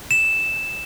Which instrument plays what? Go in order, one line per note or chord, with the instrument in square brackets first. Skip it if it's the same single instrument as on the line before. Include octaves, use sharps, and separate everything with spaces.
[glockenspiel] E7